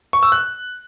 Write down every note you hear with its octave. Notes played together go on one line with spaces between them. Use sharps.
C#6
E6
F#6